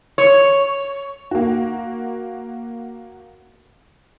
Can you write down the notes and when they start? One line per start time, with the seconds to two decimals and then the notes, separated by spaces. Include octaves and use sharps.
0.18 C#5
1.31 A#3 F#4